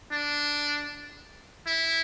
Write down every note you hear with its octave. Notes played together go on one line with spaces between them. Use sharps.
D4
E4